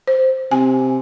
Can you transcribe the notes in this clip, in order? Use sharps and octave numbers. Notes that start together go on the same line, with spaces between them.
C5
C3 G#5